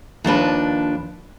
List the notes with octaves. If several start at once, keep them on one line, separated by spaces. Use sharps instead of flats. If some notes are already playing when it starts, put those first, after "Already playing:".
D#2 F3 D4 B4